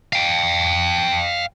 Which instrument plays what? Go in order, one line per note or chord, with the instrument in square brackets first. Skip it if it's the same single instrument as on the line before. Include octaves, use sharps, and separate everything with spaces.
[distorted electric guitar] F5 G5